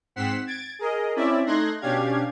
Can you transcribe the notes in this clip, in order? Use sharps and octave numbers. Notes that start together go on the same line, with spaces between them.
G#2 C4 F#5 B6 C7 E7
G#6 A6 D7
G#4 A#4 D#5
C4 C#4 E4 D5 E5
A3 D#4 C6 F#6 G#6 A#6
B2 C#4 D4 G4 F5 G#6